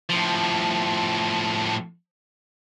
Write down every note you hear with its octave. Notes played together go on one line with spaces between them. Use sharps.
A2 F3